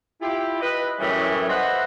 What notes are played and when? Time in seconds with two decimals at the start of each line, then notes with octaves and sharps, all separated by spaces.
0.21 E4 F4 G4
0.61 B4 D#5
1.00 F#2 A2 E3 G3 C#4 G#4
1.49 B4 C5 D#5 E5 F#5